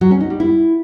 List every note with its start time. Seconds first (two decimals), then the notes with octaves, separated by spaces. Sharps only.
0.01 F#3
0.11 C#4
0.20 D#4
0.30 G3
0.40 E4